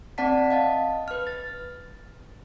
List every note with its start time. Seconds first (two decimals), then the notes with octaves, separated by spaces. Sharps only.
0.18 C4 D5 F#5 A5 B6
0.50 D#5 F5 A5
1.08 B4 F6
1.27 A6